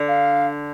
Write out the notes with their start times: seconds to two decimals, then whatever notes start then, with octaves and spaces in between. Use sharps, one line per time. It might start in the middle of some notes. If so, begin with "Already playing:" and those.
Already playing: D3
0.08 F5